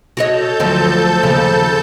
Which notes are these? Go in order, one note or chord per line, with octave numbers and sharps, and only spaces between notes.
F#4 A4 C#5 D#5 A5 G6
D2 F3 F#3
D#2 C#3 F3